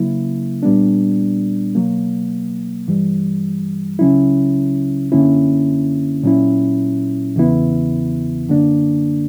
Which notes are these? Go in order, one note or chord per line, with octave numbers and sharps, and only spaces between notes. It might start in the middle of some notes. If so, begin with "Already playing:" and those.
Already playing: C#3 F#3 A#3 E4
A#2 G3 B3 D4
B2 F#3 A#3
G2 E3 G3
C#2 C#3 F#3 C#4 E4
F#2 D3 A#3 C#4 E4
A#2 F#3 C#4 E4
E2 C#3 E3 B3 E4
F#2 D3 A#3 D4